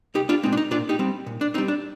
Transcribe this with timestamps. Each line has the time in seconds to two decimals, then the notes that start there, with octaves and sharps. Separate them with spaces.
0.14 C2 D#4 G4
0.29 D4 F4
0.43 A#2 G#3 C4 D#4
0.52 D4
0.57 D#4
0.71 A#2 D4 F4
0.89 D#4 G4
0.99 G3 C4
1.26 A#2
1.41 D4
1.54 C4 D#4
1.58 G3
1.68 D4